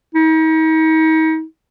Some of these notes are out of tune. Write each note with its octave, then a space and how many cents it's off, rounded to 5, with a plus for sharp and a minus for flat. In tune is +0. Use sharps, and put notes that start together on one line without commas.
D#4 +40